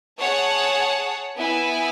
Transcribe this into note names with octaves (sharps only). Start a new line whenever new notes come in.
G#4 C#5 F#5 A5
B3 E4 B4 E5 G#5